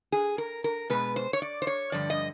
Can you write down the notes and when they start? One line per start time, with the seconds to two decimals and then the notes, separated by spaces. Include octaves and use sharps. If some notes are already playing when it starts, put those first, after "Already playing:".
0.12 G#4
0.38 A#4
0.64 A#4
0.90 B2 G#3 B3 B4
1.16 C5
1.33 C#5
1.42 D5
1.62 C5
1.67 C#5
1.92 G2 D3 F3 D5
2.10 D#5